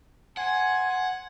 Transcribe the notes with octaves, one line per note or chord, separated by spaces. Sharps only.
C5 F#5 G#5